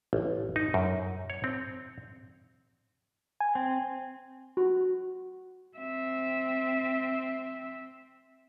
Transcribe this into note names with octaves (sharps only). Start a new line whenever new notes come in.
A1
D#4
F#2
C#5
C4
G#5
C4
F#4
C4 E5